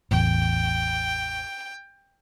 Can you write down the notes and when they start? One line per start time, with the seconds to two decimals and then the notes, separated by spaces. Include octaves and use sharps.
0.11 A1 E2 A2 G5